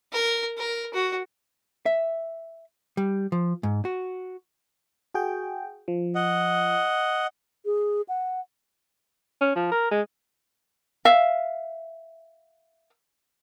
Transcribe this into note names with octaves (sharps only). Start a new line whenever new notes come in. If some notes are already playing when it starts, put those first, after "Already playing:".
A#4
A#4
F#4
E5
G3
F3
G#2
F#4
F#4 G#4 G5
F3
D#5 F#5
G#4
F#5
C#4
F3
A#4
G#3
E5 F5